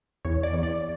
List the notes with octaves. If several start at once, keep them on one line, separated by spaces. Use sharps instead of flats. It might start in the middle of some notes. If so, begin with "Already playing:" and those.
E2 C#5
D5
E2
D5